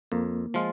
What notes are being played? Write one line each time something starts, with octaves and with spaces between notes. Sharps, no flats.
F2 A#3
F3 G#3 F4